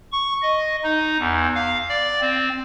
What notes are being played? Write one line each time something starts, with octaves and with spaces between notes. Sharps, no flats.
C#6
D#5
D#4
E2
F5
D5
C4